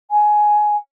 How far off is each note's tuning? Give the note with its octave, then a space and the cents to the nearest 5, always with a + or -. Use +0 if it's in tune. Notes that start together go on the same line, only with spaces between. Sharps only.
G#5 +15